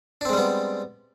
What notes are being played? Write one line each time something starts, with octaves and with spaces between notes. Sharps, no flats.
G3 G#3 B3 C4 D4